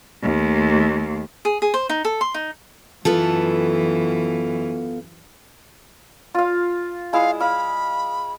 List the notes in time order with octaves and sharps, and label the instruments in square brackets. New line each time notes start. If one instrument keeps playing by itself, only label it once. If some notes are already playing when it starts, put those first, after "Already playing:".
[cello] D#2 A3
[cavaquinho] G#4
G#4
C5
D#4
A4
C6
D#4
[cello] F#2 E3 [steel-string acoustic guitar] B3 F4 A4
[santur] F4 F5
[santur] G#3 E4 [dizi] F5
[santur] F5 [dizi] B5